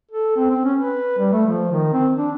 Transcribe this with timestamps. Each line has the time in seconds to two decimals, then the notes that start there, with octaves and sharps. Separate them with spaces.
0.11 A4
0.36 C4
0.50 C4
0.65 C#4
0.78 B4
1.18 G3
1.33 A3
1.46 F3
1.72 D#3
1.93 C4
2.16 D4